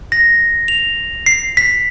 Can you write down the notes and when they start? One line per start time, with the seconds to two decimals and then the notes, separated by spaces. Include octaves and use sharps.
0.12 A#6
0.68 F7
1.26 C7
1.57 B6